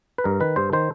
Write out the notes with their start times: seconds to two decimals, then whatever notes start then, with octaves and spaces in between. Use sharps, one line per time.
0.18 B4
0.24 G2 A#4
0.40 D#3 B4
0.56 G2 C5
0.73 D#3 C5